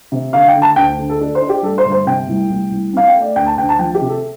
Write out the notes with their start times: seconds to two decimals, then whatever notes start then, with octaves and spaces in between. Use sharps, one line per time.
0.12 C3
0.33 D3 F5
0.48 G5
0.55 D3
0.62 A5
0.76 D2 G5
0.98 D3
1.09 A4
1.20 D4 A4
1.35 C5
1.41 D4
1.49 G4
1.63 G2 A4
1.78 C5
1.85 G1
1.92 C5
2.06 C3 G5
2.28 C2
2.50 C2
2.71 C2
2.93 C4 F5
3.08 G5
3.15 A3
3.22 D5
3.36 D2 G5
3.46 A5
3.58 D2 G5
3.69 A5
3.79 F3 G5
3.94 G4
4.01 C3
4.09 A4